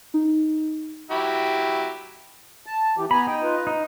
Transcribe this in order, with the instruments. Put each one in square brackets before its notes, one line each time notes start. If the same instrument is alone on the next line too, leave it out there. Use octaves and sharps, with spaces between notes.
[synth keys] D#4
[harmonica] F#3 E4 G4
[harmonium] A5
E3 G4
[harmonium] B3 G#5 A#5 [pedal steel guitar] B5
[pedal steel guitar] D#4 [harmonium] G5
[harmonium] F4 B4
[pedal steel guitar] D#4